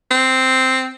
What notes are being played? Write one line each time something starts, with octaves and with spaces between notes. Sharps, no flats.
C4